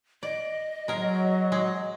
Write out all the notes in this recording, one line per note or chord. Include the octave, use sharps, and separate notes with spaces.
D5 D#5
F#3 G#3 A#4
G#3